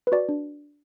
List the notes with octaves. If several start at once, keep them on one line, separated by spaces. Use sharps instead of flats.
B4
F#4 D5
D4